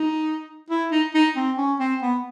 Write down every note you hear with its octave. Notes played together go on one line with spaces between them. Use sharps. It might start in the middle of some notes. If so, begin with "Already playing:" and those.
Already playing: D#4
E4
D#4
D#4
C4
C#4
C4
B3